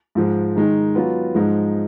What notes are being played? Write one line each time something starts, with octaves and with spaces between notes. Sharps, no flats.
G#2 F3 G#3
D#3 G#3 D#4
F#3 B3 F4
G#2 F3 G#3 D#4